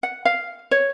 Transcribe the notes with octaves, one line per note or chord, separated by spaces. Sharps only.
F#5
F5
C#5